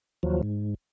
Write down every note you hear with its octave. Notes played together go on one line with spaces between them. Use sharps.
D#2 F3 F#3
G#2